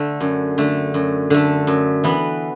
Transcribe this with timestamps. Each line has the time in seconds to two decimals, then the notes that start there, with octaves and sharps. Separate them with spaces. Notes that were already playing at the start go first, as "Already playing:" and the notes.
Already playing: D3 A3
0.20 F#2
0.58 D3 A3
0.94 F#2
1.30 D3 A3
1.67 F#2
2.04 E3 B3